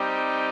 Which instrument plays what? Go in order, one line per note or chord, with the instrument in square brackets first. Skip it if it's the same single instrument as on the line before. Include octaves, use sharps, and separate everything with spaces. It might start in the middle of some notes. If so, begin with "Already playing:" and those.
Already playing: [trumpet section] G3 C4 D#4 G4